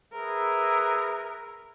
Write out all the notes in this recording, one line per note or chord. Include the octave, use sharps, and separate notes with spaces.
G#4 A#4 B4 E5